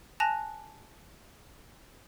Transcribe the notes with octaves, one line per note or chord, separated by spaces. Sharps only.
G#5 A5 F#6 A#6 F7